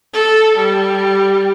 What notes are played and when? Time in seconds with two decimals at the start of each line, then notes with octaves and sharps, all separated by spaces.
0.13 A4
0.57 G3